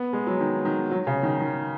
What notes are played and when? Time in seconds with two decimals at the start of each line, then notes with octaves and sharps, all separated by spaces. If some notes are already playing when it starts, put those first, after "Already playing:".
Already playing: B3
0.13 G#3
0.26 F#3
0.40 D#3
0.65 D#3
0.91 F#3
1.07 C#3
1.23 D#3
1.40 D#3